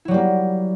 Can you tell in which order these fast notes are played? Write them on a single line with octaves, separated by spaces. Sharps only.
E4 F#3 G3 A#3